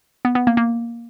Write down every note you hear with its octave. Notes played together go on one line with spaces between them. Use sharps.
B3
B3
A#3
A#3